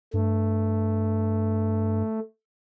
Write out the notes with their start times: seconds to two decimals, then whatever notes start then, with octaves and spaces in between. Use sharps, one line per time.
0.14 G2 A3